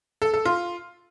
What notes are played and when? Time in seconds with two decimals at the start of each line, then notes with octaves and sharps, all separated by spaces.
0.22 A4
0.34 A4
0.45 F4